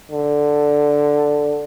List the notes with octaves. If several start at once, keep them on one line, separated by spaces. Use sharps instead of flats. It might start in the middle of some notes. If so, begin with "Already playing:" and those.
D3